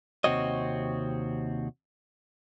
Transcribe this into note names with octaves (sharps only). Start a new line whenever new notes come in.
D#2 C3 C4 F#4 C#5 D#5